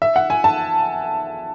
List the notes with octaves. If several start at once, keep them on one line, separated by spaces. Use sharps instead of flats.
E5
F#5
G#5
A5